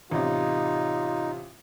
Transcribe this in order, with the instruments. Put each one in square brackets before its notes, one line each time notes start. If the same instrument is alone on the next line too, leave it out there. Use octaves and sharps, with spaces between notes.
[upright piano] A1 C3 [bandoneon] D#4 [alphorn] F4